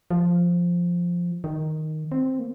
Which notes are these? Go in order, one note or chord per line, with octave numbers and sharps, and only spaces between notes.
F3
D#3
C4
A#3